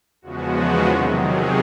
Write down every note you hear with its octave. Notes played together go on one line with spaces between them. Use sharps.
E2 C#3 F3 G#3 B3 F#4
C3 D#3 F#3
G#4